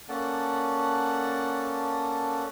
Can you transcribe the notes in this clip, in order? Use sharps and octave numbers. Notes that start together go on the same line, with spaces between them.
A#3 C#4 A4 D5 F#5 A5